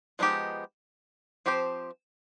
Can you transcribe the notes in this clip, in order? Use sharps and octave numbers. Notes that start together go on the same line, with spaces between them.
F3 G#3 B3 D#4 G4
F3 C4 G4 C5